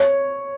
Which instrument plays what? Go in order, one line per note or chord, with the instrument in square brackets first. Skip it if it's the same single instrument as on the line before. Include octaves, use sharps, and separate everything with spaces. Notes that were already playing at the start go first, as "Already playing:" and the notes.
Already playing: [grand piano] C#5